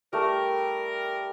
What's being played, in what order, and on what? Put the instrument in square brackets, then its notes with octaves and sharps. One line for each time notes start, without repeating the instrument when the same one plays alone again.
[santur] G3 A3 [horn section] A#4